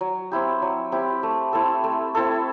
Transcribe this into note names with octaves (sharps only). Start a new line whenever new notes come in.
F#3
C4 E4 G4
F#3
C4 E4 G4
A3
C4 E4 A4
A3
C4 E4 A4